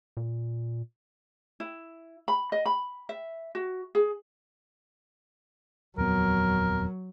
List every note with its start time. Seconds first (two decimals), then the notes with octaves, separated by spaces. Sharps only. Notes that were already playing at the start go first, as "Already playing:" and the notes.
0.17 A#2
1.60 E4
2.28 B5
2.52 D#5
2.66 B5
3.09 E5
3.55 F#4
3.95 G#4
5.98 D#1 F2 F#3 B3 A#4